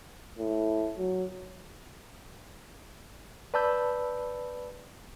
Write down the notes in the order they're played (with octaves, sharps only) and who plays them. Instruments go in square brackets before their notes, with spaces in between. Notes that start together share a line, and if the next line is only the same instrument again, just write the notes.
[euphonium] A2
F#3
[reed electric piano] B4 D5 A5 B5 E6 G6